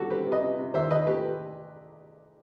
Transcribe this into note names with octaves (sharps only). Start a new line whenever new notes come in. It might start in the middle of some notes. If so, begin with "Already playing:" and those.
Already playing: D#3 G3 F#4 A4
C4 G4 B4
C3
B4 D#5
C3
C3
D#2 C5 E5
D#2 B4 D#5
A3 G4 B4